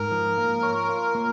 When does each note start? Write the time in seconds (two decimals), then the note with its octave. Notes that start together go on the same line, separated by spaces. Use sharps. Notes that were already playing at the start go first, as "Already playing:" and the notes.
Already playing: G#2 A#4
0.11 F3
0.38 A#3
0.63 C#5
0.89 F4
1.15 A#3